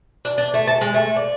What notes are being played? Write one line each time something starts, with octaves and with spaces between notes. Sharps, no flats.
D4
D4
A3
A5
G#3
A3
D5